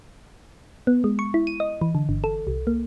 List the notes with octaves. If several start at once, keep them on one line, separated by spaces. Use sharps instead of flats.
B3
G#3
C#6
E4
D#7
D#5
E3
D3
G1
A4
C2
A#3